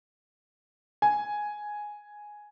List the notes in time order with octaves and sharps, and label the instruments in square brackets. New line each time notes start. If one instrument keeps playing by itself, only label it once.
[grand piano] G#5